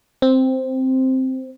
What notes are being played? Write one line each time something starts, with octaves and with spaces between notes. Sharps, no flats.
C4